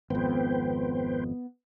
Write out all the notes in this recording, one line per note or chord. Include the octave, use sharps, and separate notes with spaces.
G#1 F2 B3 B4 C5 G5